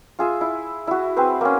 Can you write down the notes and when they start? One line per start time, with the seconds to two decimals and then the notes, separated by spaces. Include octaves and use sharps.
0.19 F4 G#4 E5
0.41 E4
0.87 E4 F#4
1.16 C4 G#4 B4 C5
1.41 A#3 C#4